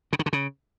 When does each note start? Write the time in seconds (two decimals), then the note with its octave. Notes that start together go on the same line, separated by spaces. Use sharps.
0.13 C#3
0.19 D#3
0.26 D3
0.33 C#3